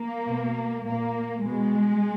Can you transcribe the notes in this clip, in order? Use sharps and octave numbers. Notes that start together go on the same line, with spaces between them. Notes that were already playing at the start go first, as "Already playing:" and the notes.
Already playing: A#3
B2
A#2 A#3
B2 G#3